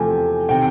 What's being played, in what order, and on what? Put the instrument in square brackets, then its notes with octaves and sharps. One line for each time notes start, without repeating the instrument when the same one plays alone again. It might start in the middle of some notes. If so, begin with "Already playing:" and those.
Already playing: [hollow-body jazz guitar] E2 C3 F3 A3 [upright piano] G5 G#5
[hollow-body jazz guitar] C3 D#3 [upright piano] G5